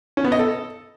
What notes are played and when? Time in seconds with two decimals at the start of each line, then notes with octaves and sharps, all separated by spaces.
0.17 C#4
0.24 B3
0.32 D#5
0.39 A4